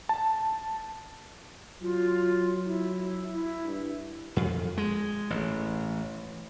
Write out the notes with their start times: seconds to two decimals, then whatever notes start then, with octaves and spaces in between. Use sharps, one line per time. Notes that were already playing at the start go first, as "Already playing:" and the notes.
0.09 A5
1.82 F#3 F4
2.65 E4
3.34 E4
3.64 G2
4.36 F2
4.78 G#3
5.30 A1